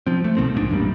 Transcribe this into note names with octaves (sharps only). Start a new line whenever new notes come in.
F3 C4
A3
C2 B2 D#3 C4
A#1 G#2 E3 D4
A1 F#2 A#2 G3